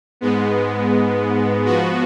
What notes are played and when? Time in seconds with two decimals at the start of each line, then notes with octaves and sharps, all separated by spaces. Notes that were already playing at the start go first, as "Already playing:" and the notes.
0.21 G#2 G#3 B3
1.65 F3 B3 F#4